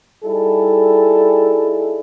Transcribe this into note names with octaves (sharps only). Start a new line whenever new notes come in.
G3 D#4 E4 G#4 A4